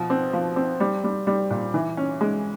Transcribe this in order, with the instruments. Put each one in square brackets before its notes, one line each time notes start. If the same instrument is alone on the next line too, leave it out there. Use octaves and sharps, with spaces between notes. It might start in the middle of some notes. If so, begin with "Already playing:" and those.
Already playing: [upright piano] B2 F3
C4
F3
C4
G3
G3
G3
A#2
E3
C#4
G#3